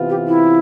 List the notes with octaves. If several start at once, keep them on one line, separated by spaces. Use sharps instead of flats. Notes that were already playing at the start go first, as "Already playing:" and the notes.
Already playing: C3 E3 B3 F4
G4
E4